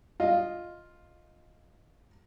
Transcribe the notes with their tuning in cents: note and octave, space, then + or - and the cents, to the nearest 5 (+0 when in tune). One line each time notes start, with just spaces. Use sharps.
F4 +0 D#5 +0